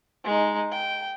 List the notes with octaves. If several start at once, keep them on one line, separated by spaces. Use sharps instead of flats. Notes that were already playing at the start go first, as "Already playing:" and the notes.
G#3 D#4
G5